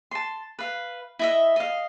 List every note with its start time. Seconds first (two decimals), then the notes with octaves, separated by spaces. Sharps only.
0.11 A5 C6
0.59 B4 F5
1.19 E4 D#5 E5
1.56 D#5 F5